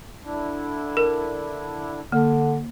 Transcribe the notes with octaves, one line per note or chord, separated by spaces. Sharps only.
D3 D4 E4
A#4
D3 A#3